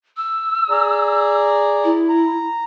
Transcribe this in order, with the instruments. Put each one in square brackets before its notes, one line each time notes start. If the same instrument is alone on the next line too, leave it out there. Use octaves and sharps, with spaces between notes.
[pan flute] E6
[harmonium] G#4 D5 A#5
[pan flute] E4
[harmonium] A#5